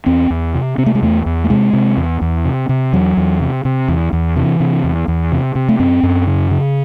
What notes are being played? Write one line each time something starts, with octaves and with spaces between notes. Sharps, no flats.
E2 C4
E2
C3
C3 C4
A3
G#3
E2 A3
E2
A3
C3 G#3
C3
E2
E2
C3
C3
E2 F#3
E2
C3
C3
E2
E2
C3 E3
C3
E2
E2
C3
C3
A3
F#2 C4
F#2
C#3
C#3